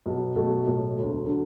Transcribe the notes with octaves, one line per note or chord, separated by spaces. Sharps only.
B1 B2 B3
B1 B2 A3 F#4 A4
B1 A2 A3
E1 D2 D3
D3 F#3